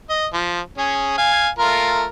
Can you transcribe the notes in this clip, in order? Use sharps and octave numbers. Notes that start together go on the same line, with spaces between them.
D#5
F3
C#4 G#4
F5 G#5
A3 F4 A#4